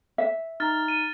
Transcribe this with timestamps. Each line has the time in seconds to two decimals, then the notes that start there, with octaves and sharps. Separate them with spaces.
0.18 E5
0.60 D#4 A#5 F6 A6
0.88 D#7